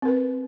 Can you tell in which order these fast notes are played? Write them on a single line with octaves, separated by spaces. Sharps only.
C4 A#4 B4